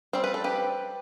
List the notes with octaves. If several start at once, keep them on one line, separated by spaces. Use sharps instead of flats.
G3 C4 C5
B4
A4
G4 B4